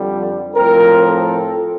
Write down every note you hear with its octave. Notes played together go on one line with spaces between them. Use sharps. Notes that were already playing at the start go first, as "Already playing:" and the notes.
Already playing: F2 D3 G3
A2 F3 C4 A#4
A4